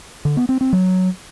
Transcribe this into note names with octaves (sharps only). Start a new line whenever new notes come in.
D3
B3
C4
C4
F#3